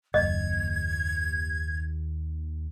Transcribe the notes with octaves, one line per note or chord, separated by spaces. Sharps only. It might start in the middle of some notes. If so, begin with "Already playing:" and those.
F#1 D#2 D#5 G#6